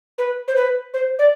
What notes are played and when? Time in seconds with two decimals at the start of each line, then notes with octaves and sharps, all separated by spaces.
0.18 B4
0.48 C5
0.56 B4
0.94 C5
1.19 D5